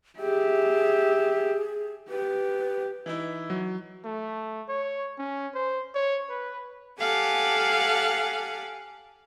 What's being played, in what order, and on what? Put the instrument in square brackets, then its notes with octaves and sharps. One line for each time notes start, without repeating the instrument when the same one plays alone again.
[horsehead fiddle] G4 E5 [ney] G#4
[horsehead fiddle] G4 [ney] B4
[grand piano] E3 D#4 E4
[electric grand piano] F#3
[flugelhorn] A3
C#5
C#4
C5
C#5
B4
[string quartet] G4 A4 F5 F#5 G#5